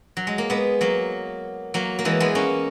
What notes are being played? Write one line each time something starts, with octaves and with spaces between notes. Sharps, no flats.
F#3
G#3
A#3
G#3 B3
F#3 A#3
F#3 A#3
A#3
E3 G#3
G#3 B3
A#3 C#4